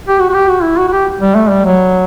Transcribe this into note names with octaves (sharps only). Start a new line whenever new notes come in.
G4
F#4
F#4
G4
F#4
E4
F#4
F#4
G4
G3
A3
G3
F#3